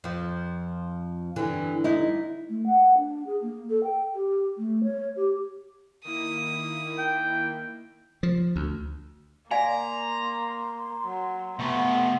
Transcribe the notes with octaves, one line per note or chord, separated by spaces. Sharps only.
F2 F3
G2 D3 E3
D#4 E4
A3
F#5
D4
G#4
A#3
A4
G5
G4
A3
C#5
G4
D#3 A#3 E4 D#6
G5
F3
D2
A#3 D5 F5 G#5 A#5 C6
F#3
C3 A3 B3